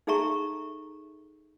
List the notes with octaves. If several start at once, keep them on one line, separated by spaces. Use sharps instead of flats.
D#4 G#4 A4 E5 A#5 C#6